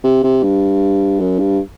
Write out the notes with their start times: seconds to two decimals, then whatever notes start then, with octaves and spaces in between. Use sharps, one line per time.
0.04 C3
0.24 C3
0.43 G2
1.20 F#2
1.39 G2